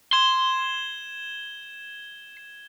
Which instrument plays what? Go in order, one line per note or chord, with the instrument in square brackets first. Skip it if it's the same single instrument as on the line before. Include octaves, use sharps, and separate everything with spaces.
[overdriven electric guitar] C6 [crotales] G#6 E7 G7